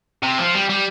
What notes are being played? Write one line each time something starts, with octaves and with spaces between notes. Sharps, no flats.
C3
F3
G3
G3